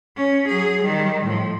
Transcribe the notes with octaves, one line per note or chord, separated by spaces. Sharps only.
C#4
F#3 G#4
D#3 G3
A2 F3